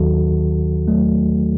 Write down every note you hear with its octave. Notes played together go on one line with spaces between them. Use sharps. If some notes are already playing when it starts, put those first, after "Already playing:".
Already playing: D#2 D#3 F#3 F#4 A4
F#3 A3